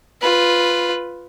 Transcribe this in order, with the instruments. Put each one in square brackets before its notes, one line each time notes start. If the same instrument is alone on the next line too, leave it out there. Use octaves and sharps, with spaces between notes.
[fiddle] F4 B4